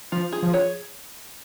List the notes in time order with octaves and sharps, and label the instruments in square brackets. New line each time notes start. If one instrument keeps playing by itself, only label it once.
[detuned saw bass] F3 [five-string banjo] F4
[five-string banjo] G#4
[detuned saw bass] F3
[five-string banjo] C#5